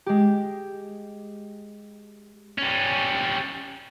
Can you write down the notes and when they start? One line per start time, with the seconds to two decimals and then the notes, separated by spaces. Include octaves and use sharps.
0.06 G#3 G4
2.58 G3 C#4